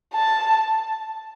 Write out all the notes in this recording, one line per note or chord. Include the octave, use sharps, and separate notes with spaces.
A5